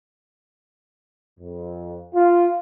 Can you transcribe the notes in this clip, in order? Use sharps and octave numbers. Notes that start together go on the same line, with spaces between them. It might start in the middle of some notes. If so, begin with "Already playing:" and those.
F2
F4